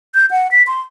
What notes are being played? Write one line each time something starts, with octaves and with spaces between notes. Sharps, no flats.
G6
F#5
B6
C6